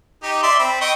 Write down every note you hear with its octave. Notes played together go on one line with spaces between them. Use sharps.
D#4 G4
D5 E5 C6
C4 B5
D#5 G5 C#6